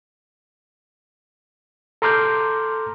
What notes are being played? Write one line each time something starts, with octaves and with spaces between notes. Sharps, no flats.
A4 A#5 C6 D6 F6 G6